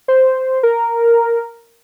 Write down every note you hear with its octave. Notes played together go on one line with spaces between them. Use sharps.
C5
A#4